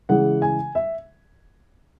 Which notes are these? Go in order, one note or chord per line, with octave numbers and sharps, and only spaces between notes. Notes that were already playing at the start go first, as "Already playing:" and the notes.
C#3 E3 G#3 F#5
G#5
E5